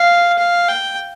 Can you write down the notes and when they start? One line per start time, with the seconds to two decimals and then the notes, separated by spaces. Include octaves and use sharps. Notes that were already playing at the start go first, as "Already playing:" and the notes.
Already playing: F5
0.38 F5
0.68 G5